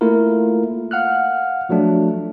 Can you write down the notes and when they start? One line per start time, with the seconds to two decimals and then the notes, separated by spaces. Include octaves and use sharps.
0.01 A3 A#3 E4 F4 A#4
0.91 F5 F#5 F6 F#6
1.69 F3 F#3 A3 D4